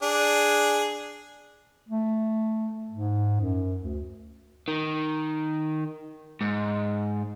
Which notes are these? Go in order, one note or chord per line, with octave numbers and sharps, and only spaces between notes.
D4 G#4
A3
G#2
F#2
D2
D#3
G#2